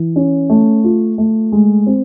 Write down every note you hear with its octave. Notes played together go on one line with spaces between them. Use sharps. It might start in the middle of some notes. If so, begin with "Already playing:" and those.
Already playing: E3
C#4
A3
F4
A3
G#3
C4